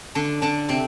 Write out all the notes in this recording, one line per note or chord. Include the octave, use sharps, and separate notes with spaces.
D3 D4
D3 D4
C3 C4